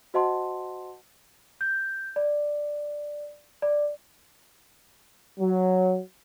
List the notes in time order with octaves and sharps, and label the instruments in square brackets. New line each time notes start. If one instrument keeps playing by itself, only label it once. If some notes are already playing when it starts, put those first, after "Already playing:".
[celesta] F#4 C5 D#5 F#5 A5 C6
G6
D5
D5
[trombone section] F#3